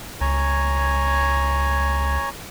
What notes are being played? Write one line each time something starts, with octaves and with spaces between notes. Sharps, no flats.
C#2 C#5 G#5 A#5